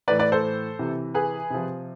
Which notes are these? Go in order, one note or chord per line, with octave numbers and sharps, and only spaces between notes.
A2 E3 B4 D5
B4 D5
A4 C5
C3 E3
G#4 B4
C3 F3